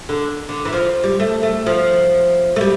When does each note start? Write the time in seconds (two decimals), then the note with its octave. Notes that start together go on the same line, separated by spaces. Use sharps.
0.09 D3
0.49 D3
0.65 E3
0.73 F3
1.03 G3
1.20 A3
1.43 A3
1.66 F3
2.56 A3
2.61 G3